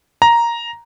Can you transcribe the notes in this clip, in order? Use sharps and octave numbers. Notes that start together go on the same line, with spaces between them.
A#5